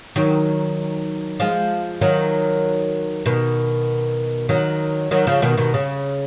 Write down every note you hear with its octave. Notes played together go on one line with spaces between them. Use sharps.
D#3 F#3
F3 G#3
D#3 F#3
B2 D#3
D#3 F#3
D#3 F#3
C#3 F3
B2 D#3
B2 D#3
C#3